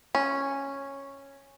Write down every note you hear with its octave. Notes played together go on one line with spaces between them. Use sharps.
C#4